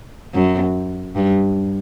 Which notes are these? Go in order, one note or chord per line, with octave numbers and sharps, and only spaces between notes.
F#2
G2